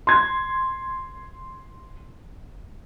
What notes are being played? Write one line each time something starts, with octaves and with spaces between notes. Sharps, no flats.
C6 G#6